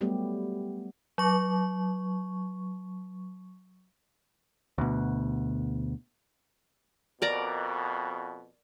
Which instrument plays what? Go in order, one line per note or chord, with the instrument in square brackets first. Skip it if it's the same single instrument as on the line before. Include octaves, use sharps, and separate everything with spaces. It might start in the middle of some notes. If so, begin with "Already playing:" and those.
[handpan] F#3 G3 A3 B3 G4
[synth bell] F#3 C#6
[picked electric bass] D2 B2
[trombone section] F2 B2 [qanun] A#4 D5 A#5